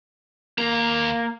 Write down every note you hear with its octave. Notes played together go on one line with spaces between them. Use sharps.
D#2 A#3 A#5